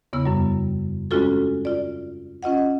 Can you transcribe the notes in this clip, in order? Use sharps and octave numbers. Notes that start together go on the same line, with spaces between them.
E2 C#3 B3 E4 E6
F#2 G3
G#3 C4 C#4 F4 F#4 A4
F4 D5
C#4 F4 D#5 F#5